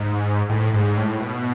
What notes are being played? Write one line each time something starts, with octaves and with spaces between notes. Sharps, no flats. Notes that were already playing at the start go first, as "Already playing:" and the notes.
Already playing: G#2
A2
G#2
A2
B2